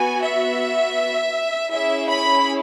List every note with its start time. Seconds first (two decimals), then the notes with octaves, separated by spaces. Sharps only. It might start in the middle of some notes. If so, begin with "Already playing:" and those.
Already playing: B3 F#4 G#5
0.23 E5
1.72 C#4 E4 G#4 E5
2.10 B5